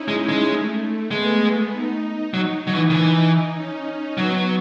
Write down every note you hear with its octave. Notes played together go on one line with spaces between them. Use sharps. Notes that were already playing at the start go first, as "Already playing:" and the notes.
Already playing: C#4 D#4 E4
G#3
G#3
A3
G#3 B3
D#4
F#3
F#3
E3
D#3
E3 D#4
C#4
F#3 B3